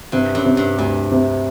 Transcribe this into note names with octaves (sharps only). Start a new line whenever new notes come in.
G2 C3
F#2
C3
G2
D2 G2
C3